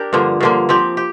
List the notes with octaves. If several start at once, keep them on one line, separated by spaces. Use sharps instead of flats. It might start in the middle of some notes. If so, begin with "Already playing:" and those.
Already playing: D4 G4 A#4
G2 D3 F3 A#3
G2 D3 F3 A#3
F3 C4 G4
G4